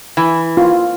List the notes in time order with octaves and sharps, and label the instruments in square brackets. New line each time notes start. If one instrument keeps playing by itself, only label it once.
[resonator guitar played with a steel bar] E3
[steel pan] F4